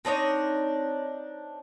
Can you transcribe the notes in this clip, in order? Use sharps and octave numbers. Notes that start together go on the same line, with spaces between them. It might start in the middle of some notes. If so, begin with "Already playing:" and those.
C4 D4 D#4 C#5